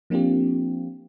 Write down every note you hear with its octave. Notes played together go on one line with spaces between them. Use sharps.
F3 A#3 C4 D4 F4 G4